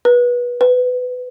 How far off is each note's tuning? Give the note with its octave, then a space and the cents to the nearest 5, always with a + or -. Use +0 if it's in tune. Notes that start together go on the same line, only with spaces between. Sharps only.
B4 -20
B4 +20